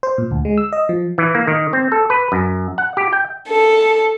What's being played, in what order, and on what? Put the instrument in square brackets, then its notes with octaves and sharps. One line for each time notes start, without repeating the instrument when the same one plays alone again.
[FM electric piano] C5
A#2
D2
G#3
E6
D#5
F3
[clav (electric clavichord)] E3
A#3
D#3
C4
A4
B4
F#2
F#5
G4
G5
[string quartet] A4